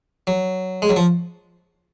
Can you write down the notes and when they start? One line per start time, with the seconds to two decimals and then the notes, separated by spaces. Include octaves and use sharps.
0.27 F#3
0.82 G#3
0.89 F#3
0.96 F3